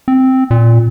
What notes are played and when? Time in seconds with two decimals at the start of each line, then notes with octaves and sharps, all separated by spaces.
0.08 C4
0.51 A#2